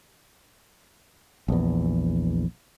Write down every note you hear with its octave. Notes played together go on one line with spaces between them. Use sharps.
A#1 E2